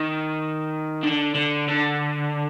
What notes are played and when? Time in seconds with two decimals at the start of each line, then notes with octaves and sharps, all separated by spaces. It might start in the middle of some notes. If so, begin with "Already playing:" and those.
Already playing: D#3
1.03 D3
1.35 D3
1.68 D3